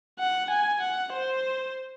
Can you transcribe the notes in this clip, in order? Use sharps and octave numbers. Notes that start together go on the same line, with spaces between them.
F#5
G#5
F#5
C5